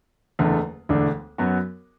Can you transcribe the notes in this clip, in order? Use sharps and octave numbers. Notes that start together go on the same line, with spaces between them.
F#1 E2 D3 A3
E1 D2 D3 A3 D4
F#2 F#3 B3 F#4